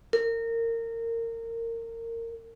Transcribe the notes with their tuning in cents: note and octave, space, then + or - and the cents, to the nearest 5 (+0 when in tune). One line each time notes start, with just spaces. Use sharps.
A#4 -25